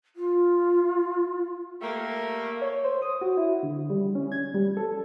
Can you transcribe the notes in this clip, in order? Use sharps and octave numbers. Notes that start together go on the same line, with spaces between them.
F4
G3 A3 A#3
C#5
C5
D#6
F#4
E4
D3
G3
C#4
G#6
G3
A4